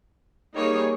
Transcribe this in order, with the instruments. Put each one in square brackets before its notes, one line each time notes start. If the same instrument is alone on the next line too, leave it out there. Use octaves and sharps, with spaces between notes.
[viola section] G3 A#3 D#4 G#4 C#5